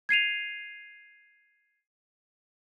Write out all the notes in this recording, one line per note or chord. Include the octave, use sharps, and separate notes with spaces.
G#6 C7 D#7 F7